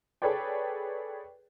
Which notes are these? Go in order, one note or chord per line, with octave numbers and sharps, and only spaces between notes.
G#4 A4 B4 C#5 D5 G5